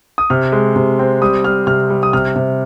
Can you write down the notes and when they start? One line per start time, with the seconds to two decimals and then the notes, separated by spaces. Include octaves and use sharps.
0.18 D#6
0.30 C3 F6
0.52 G#3
0.76 C3
0.99 C4
1.22 G3 D#6
1.44 G3 F6
1.67 C3 F6
1.90 G3
2.03 D#6
2.13 C3 F6
2.36 C3